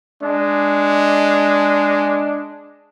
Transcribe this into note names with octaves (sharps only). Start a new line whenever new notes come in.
G#3 D4